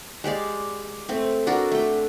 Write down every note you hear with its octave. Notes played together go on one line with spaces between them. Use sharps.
G#3 G4 D5 F5
A3 C4
D4 F#4 A4 A#4
A3 G5